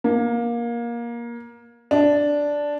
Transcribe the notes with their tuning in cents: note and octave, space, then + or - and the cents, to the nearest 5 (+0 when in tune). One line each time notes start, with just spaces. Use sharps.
A#3 +20
D4 -5